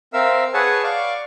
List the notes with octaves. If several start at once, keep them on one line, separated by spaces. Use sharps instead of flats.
C4 A#4 E5 F5 E6
G#4 B4 C#5 F#5 G#5 A5
D5 F5 C#6 D6